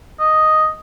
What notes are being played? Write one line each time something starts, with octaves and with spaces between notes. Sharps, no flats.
D#5